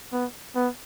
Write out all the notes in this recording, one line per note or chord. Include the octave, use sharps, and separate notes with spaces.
B3
B3